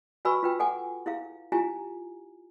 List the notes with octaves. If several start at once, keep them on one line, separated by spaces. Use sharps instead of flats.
F#4 B4 G#5 B5 C#6 E6
F4 B4 G5
A4 F#5 G#5 D6
E4 G#4 F5
E4 F4 G4 G#5 A#5